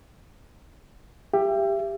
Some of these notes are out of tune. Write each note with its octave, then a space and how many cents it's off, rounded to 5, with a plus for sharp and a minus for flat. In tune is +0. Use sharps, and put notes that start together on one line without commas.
G4 +15 E5 +35